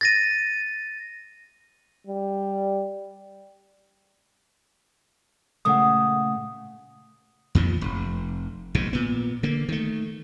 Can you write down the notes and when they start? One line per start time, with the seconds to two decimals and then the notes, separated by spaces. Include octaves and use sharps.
0.01 A6 A#6 D#7
2.07 G3
5.65 A#2 C#3 A3 F#5 D#6
7.55 F2 A#2 D#3 F3
7.81 F1
8.75 A#1 G#2 B2
8.93 A#2 B3
9.43 D3 A#3
9.69 D#3 A3